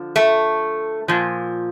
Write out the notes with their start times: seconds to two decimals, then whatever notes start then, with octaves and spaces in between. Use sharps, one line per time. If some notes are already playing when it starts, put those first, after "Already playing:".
Already playing: D3 F3
0.16 A3
1.08 A#2 F3